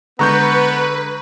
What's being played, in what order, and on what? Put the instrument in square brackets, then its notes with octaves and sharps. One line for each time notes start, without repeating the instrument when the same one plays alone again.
[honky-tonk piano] D3 G#3 [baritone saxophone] B3 [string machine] B4 [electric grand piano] A#5 C#6 G6